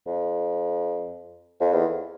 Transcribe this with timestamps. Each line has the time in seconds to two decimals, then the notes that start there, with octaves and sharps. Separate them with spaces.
0.07 F2
1.61 F2
1.73 E2